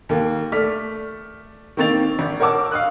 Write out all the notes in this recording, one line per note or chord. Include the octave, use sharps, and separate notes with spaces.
D#2 A#3
A3 D5 F6 B6
D#3 A#3 C4 C#6 A6 F7
G#1
A#4 C#5 F#5 A5 D6 E6
F5 C#6 D#6 F#6